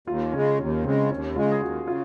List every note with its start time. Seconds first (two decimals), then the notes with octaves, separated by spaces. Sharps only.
0.07 D#2 F4
0.33 C#3 G#3 C#4
0.59 D#2 C#4
0.84 C#3 G#3 C4
1.11 D#2 C#4
1.36 C#3 G#3 F4
1.52 G#4
1.61 D#2 F#4
1.88 C#3 F4